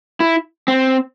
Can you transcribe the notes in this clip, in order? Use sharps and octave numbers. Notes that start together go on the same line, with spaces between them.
E4
C4